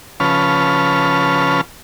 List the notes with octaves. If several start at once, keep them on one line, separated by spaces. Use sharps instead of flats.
C#3 F3 C#4 B4 A5 F6